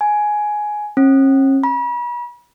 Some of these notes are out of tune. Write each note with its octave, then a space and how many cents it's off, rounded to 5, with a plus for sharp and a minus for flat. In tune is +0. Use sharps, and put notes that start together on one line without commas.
G#5 +10
C#4 -40
B5 -40